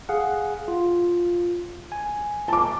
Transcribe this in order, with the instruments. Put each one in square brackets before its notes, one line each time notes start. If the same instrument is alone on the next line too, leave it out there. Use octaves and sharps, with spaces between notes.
[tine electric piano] G#4 F5 F#5
F4
G#5
[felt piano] A5 D6